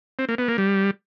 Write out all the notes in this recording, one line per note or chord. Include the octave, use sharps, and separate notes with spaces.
C4
A#3
B3
A#3
G3